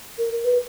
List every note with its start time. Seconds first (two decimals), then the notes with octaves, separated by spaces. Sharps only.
0.18 A#4
0.44 B4